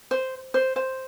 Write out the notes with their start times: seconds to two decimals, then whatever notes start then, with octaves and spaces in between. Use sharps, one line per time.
0.11 C5
0.54 C5
0.76 C5